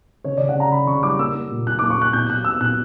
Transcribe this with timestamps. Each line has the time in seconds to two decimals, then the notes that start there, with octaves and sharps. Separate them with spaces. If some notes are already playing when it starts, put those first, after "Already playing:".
0.24 C#3 C#5
0.37 D5
0.41 C#3
0.49 F#5
0.56 C#3 A#5
0.72 C#3 B5
0.87 C#3 C#6
1.03 G3 D6
1.19 A#3 E6
1.35 A#3
1.51 A#2
1.67 A#2 F#6
1.79 A#3 D6
1.90 C#6
1.98 A#3 F#6
2.13 B2 G6
2.30 B2 F#6
2.44 B3 E6
2.61 B2 F#6